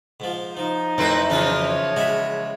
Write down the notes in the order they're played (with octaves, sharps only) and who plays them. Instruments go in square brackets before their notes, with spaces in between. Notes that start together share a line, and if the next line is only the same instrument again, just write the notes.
[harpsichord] G#2 F3
[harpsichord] F3 [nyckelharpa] D#4
[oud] F2 D#3 F#3 [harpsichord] A3 [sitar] C4 E4 B4
[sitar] C#3 E3 F3 [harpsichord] F4 B4 C5
[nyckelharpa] C#5
[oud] G#3 [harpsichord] F#4 E5 B5